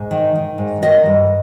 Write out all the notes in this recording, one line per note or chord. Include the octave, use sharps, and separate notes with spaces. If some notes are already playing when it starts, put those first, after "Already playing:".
Already playing: G#2
D#3
D#3
G#2
D#3 D#5
G2